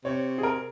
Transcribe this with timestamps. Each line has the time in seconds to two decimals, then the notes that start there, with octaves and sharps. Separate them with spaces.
0.05 C3 C#5
0.38 G#4
0.43 A#4